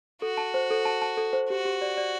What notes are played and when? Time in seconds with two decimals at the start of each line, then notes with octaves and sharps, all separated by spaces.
0.22 F#4 A4
0.37 A5
0.54 C5
0.71 A4
0.85 A5
1.02 A5
1.17 A4
1.33 C5
1.50 F#4 G4
1.65 G4
1.82 D5
1.97 D5